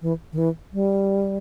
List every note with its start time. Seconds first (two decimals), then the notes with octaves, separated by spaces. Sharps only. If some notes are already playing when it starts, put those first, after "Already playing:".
0.02 E3
0.32 D#3
0.38 E3
0.73 G3